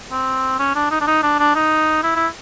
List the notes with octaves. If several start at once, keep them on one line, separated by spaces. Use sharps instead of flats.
C4
C#4
D4
D#4
D4
D#4
D4
D4
D#4
E4
E4